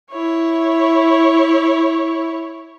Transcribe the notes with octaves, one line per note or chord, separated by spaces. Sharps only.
E4 C#5